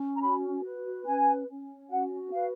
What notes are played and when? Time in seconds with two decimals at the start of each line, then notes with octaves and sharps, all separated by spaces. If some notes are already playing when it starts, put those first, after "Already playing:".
Already playing: C#4
0.16 A#5
0.21 F#4 B5
0.64 B4
1.06 C#4 G#5
1.48 C#4
1.90 F#4 F#5
2.32 B4 F5